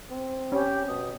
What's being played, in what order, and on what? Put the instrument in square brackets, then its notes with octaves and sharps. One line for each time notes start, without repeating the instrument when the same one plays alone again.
[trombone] C4
[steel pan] C#4 [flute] G4
[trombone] B2 [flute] D#6